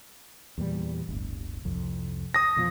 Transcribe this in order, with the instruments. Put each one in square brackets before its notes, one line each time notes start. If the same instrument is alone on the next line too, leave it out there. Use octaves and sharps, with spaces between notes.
[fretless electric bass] E2 A#2 G3
D1 G1
C2 F2
[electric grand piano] D#6 A#6
[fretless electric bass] F2 B2 F3